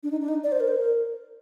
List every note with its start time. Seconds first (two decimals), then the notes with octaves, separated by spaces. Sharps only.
0.03 D4
0.11 D#4
0.21 D4
0.28 D#4
0.44 D5
0.52 C5
0.60 A#4
0.68 C5
0.76 A#4